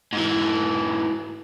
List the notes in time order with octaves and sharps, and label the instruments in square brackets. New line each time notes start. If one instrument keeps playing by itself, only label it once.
[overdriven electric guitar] G#2 E3